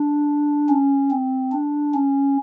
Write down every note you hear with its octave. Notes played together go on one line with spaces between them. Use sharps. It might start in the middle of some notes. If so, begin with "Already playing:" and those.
Already playing: D4
C#4
C4
D4
C#4